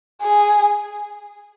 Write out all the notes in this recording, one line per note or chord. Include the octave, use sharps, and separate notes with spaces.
G#4